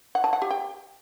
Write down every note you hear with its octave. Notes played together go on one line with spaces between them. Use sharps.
F#5
A5
F#5
G4
G5